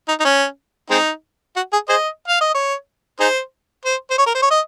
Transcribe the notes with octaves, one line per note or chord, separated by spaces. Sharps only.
D#4
D#4
C#4
G#3 C4 D#4
F#4
G#4
G#4 C5 D#5
F5
D#5
C#5
D#4 G#4 C5
C5
C5
C#5
A#4
C5
C#5
D#5